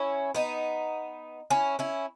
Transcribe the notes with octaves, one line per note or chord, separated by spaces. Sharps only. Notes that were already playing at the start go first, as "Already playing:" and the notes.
Already playing: C#4 E4
B3 D#4
C#4 E4
C#4 E4